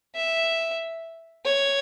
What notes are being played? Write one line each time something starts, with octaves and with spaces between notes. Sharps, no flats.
E5
C#5